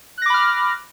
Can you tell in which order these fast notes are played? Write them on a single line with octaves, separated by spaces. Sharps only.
F#6 A#6 D6 B5 F6